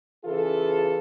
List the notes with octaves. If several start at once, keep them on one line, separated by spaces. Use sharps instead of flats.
C#3 E3 F4 G#4 A4